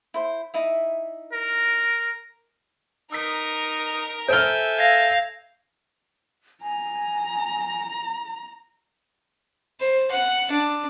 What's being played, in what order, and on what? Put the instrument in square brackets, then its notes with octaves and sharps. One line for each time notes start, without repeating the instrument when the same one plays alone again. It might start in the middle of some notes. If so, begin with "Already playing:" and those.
[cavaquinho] E4 C5
D#4 E4 E5
[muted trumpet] A#4
[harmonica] D#4 [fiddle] A#4 [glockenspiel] E6 B6
[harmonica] A4 E5 G#5 [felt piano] C5 F6 [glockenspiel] G6 D7 G7
[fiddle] F5 [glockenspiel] G#6 A#6
[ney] G#5 [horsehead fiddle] A#5
[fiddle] C5
F#5
D4